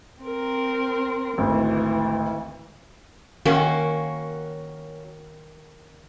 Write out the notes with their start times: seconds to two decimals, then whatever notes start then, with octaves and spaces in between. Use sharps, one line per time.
0.23 C4 A#4
1.38 G#1 D2 E3
3.45 D#3 A#3 C#4 F#4